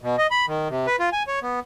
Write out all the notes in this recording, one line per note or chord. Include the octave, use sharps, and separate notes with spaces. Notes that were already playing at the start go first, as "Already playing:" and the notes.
B2
D#5
B5
D#3
C3
B4
F4
G#5
C#5
B3